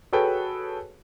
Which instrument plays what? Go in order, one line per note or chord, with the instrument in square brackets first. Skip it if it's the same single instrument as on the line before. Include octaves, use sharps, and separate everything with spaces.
[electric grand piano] F#4 G#4 A4 B4 C#5 G5